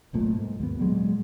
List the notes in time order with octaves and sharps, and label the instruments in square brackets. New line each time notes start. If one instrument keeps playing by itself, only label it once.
[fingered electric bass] E1 B1 A#2 A3
G#2
D#2 B3
A#2 F#3 G#3